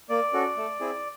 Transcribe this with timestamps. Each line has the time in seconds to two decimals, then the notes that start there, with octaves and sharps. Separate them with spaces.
0.09 A#3 D5
0.33 C#4 F#4 A4
0.57 A3
0.80 C4 E4 G#4